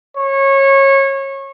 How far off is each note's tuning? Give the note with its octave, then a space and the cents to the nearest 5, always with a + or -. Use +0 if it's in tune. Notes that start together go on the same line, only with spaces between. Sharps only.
C#5 -25